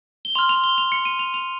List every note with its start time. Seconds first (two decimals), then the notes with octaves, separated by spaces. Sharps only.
0.25 G7
0.35 C6 F6 F7
0.49 F7
0.64 G7
0.78 F7
0.92 C#7
1.05 D#7
1.19 F7
1.34 F7